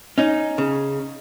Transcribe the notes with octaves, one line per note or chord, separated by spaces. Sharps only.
C#4 D#4
C#3